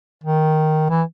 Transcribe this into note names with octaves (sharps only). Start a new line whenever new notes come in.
D#3
E3